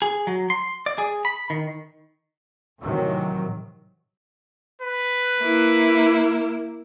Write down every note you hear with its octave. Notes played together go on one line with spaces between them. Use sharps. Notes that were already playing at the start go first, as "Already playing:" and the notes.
G#4
F#3
C6
D5
G#4
B5
D#3
A2 C3 D#3 E3 F#3
B4
A#3 E4